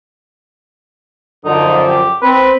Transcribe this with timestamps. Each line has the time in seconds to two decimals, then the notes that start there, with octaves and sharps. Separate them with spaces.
1.45 F#2 D3 F3 D#4
1.88 G4
2.22 C4 B4